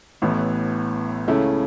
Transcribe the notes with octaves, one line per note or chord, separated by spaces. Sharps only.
A1 A2 E3 B3 E4
C#2 C#3 A3 C#4 E4